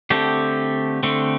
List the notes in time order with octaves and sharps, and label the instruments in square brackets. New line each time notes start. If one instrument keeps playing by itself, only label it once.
[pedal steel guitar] D3 A3 C4 G4
D3 A3 C4